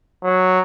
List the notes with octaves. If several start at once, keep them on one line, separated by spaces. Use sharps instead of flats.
F#3